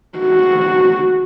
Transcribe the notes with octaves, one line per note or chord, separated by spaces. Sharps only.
F#4